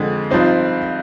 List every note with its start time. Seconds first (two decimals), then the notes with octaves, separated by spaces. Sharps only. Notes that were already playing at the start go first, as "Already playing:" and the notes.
Already playing: F2 D3 G#3
0.30 G2 F3 C4 D#4